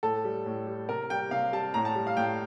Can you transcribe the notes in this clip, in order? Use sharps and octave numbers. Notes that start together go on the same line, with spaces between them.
A2 A4
G3
A2
G3
C3 A#4
G3 G5
C3 F5
G3 A5
A2 A#5
A5
G3
F5
A2 G5